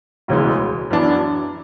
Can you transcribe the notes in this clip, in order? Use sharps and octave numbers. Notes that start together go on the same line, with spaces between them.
E1 D2 C#3 E3 G#3
F#2 E3 B3 D4